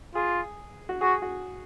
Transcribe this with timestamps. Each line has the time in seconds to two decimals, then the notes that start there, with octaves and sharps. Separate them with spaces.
0.15 F4 G#4
0.89 F#4
1.01 F#4 G#4
1.22 F#4